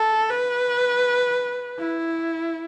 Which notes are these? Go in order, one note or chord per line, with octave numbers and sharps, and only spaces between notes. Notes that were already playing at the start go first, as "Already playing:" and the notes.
Already playing: A4
B4
E4